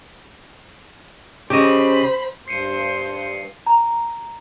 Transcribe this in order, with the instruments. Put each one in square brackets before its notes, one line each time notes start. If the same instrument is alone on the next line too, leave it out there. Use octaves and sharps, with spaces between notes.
[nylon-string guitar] C#3 [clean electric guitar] G4 D#5 [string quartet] C5 B5
[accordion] G2 [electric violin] C5 [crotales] C7 C#7 D#7
[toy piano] A#5